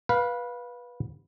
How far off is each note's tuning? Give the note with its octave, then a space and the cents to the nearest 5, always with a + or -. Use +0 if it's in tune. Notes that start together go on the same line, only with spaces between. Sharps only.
B4 -15 F5 +15